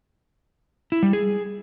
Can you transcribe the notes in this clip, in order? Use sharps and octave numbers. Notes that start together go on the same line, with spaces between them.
E4
G3
G#4